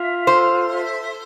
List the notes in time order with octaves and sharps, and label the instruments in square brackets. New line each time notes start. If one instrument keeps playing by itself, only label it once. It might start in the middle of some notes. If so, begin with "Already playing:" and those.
Already playing: [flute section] F4 E5
[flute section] A4 [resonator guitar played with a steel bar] C5
[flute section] E5